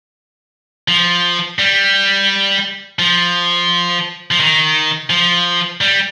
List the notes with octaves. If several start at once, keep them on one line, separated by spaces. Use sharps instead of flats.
F3
G3
F3
F3
D#3
F3
G3